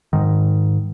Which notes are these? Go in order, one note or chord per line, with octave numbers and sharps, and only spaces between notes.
G#2 D#3